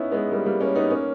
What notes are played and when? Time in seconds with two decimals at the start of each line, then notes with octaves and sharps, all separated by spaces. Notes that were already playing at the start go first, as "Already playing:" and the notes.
Already playing: B3 C#4 D#4 E4
0.11 G#3 B3
0.31 G3 A#3
0.45 G3 A#3
0.60 A#3 C#4
0.75 B3 D#4
0.90 A#3 C#4